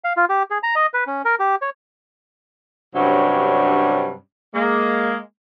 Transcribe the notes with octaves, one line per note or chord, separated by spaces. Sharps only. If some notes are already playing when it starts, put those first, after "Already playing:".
F5
F4
G4
G#4
A#5
D#5
B4
C#4
A#4
G4
C#5
G2 C3 F#3 C#4 D4
G#3 A#3